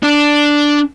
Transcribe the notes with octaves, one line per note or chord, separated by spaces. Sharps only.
D4